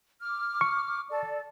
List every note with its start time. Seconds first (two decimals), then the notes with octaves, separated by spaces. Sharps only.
0.21 D6 F6
0.61 C#6
1.10 A4 D5